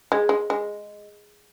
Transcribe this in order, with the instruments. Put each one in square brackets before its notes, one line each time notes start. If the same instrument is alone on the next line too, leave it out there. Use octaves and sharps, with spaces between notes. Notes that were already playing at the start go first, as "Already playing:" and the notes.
[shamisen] G#3 [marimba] G#4
[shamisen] G#3
G#3